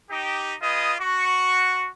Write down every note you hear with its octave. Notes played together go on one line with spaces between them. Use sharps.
D#4 G4
F4 G#4 B4 D#5 D#6
F#4 C#6